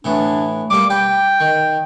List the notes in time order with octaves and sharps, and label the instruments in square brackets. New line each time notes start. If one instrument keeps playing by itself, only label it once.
[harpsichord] A2 E3 B3 [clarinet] D4
[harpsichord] G3 A#3 A4 [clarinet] D6
[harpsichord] B4 [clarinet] G5
[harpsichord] D#3